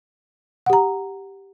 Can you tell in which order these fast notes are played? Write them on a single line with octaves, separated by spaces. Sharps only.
F#5 G4 A#5